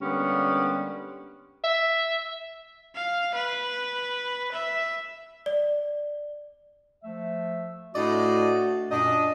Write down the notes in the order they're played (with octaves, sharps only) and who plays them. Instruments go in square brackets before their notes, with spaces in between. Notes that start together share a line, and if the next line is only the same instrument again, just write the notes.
[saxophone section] D3 G3 G#3 A#3 B3 C#4
[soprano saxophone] E5
[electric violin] F5
B4
E5
[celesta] D5
[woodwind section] F3 A3 E5
[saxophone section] A2 D5 D#5 [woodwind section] A3 D4 F#4
[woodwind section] F#2 A#2 [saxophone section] D4 D#5